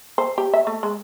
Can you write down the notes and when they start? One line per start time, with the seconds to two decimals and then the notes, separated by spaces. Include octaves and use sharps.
0.18 C5
0.38 G4
0.53 E5
0.67 A3
0.83 G#3